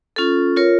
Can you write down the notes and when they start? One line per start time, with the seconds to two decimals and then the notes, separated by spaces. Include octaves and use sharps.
0.16 C#4 F4 A4
0.56 F4 A#4 C#5